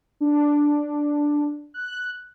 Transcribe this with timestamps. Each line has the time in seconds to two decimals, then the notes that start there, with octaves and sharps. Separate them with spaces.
0.21 D4
1.74 F#6